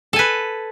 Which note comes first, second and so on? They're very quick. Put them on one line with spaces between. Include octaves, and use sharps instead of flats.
A4 G#5 B4